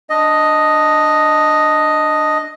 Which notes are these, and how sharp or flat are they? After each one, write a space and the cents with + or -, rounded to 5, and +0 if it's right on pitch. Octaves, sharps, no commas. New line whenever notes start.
D4 +5 D#5 +0